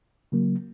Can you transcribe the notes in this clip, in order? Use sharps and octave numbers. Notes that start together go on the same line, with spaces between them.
C#3 F#3 A#3